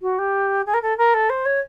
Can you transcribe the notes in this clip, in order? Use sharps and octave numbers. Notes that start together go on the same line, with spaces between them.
F#4
G4
G#4
A#4
A4
A#4
A4
C5
C#5